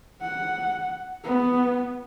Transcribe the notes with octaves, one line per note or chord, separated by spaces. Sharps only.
F#5
B3